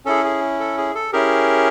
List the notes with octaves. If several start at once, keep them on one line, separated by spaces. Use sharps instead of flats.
C#4 E4 G#4 A4
G#4
A4
G#4
A4
C#4 E4 G4 G#4 A#4